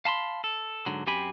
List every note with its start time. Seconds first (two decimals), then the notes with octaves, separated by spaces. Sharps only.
0.05 F5 A5 B5 C6
0.44 A4
0.86 G#2 D3 F#3
1.07 F#2 C4 G4 G5 G#5 B5